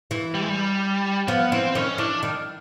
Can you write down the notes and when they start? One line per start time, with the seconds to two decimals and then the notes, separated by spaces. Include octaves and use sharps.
0.11 E3
0.34 G3
0.41 G#3
0.49 G3
1.28 F3 B3
1.52 E3 C4
1.75 D#3 C#4
1.98 E3 D4
2.23 D#3